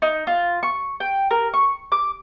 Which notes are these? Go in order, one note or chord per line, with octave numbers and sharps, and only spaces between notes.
D#4
F4
C#6
G5
A#4
C#6
D6